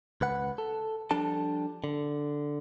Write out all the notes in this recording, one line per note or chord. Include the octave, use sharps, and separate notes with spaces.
C#2 B4 F#5
A4
F3 G3 D4 A4 A5
D3